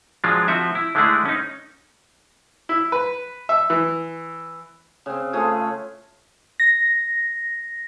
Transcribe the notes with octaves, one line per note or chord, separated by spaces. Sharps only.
F3 F#3 G#3 D4 F4
F3 C4 F#4 E5
E4
D3 G#3 A3 D4 E4 G#4
C#4 D#4
E4
B4
E5
E3
C#3 C4
A3 F4 G#4 C#5
A#6